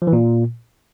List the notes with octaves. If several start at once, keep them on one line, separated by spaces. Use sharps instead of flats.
F3
E3
A#2